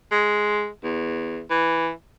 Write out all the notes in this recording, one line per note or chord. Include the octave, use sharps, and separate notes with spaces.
G#3
E2
E3